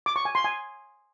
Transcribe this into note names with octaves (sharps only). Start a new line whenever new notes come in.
D6
C#6
G#5
C6
G#5